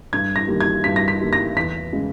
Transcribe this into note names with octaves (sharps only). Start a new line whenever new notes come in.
G2 G#6
A#6
D#3 G3 A#3
G#6
G2 B6
A#6
B6
D#3 G3 A#3
A#6
E2 B6
C#3 G#3